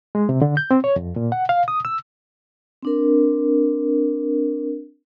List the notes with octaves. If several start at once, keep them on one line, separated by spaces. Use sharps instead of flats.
G#3
C3
D3
G6
C4
C#5
F2
A#2
F#5
F5
D#6
E6
C4 D4 A#4